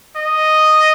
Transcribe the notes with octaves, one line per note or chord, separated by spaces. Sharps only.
D#5